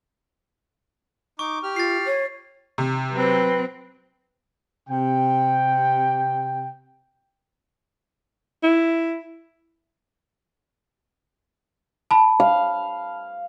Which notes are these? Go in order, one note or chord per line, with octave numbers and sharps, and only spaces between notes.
D#4 C#6 D6
G4 F6
F4 A6 C7
C#5
C3
F#3 C4 B4
C3 G5
E4
A5 B5
F5